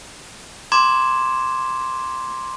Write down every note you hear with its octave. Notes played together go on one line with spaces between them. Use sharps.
A#5 C6 D6 G#6 E7